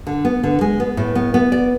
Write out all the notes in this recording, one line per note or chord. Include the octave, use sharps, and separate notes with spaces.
D3
B3
D3
G#3
B3
A2
B3
B3
D5